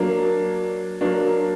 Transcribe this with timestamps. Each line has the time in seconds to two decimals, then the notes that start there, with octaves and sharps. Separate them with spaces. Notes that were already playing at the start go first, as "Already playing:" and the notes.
Already playing: F#3 A#3 D4
1.01 F#3 A#3 D4